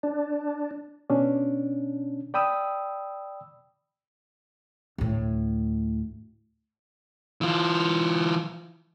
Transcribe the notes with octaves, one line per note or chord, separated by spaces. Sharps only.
D4
B2 C#4 D4
D5 G5 B5 D#6 E6
D2 A2
E3 F4